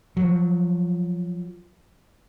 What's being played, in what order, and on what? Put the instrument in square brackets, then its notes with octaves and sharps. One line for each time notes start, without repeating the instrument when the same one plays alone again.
[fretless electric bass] F3 F#3